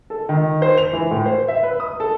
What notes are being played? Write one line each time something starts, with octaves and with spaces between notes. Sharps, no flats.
A4
D#3
C5
F7
E3
A2
C5
E5
B4
D#6
A4